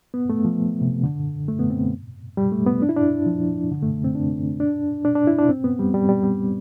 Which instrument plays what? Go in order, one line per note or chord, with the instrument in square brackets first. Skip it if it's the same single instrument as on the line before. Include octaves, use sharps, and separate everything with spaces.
[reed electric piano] B3
A3
F3
C3
D3
A3
B3
C4
G3
A3
B3
D4
E4
D4
F3
D3
A3
C4
D4
D4
D4
D4
E4
D4
C4
B3
G3
G3
G3
G3